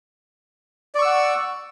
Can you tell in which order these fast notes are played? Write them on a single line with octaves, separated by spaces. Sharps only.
D5 C#6 E6 F#5